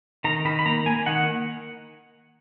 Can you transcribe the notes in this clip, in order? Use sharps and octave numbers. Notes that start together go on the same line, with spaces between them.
D#3 A#5
D#3 B5
B5
A#3 A#5
A#3 G#5
D#3 F#5